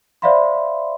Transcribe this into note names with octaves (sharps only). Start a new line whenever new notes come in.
C5 D5 E5 F5 B5 C6